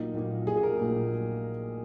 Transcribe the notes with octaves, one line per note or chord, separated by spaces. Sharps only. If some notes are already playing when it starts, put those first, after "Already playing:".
Already playing: A#1 A#2 F#3 A#3 D#4
A#1 A#2 F#3 A#3
A#1 A#2 F#3 A#3 G#4
G#4
A#4
A#1 A#2 F#3 A#3